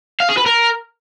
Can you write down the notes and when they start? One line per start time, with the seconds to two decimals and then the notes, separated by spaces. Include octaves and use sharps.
0.20 F5
0.29 G#4
0.37 B4
0.46 A#4